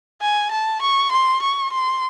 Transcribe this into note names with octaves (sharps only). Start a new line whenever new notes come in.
G#5
A5
C#6
C6
C#6
C6